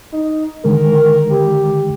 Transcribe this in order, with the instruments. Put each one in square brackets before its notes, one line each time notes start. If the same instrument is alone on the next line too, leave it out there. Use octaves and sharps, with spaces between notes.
[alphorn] D#4
[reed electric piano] D3 D#3 G#3 [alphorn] A#4
[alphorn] G4